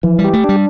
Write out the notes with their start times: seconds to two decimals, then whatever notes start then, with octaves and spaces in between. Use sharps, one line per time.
0.03 E3 F3
0.19 G3
0.24 G4
0.33 A3
0.44 G3 D4